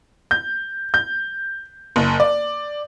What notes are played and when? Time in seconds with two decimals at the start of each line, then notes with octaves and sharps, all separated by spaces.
0.31 G6
0.94 G6
1.96 F#1
2.20 D5